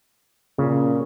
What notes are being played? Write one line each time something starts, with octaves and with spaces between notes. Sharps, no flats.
A#2 C#3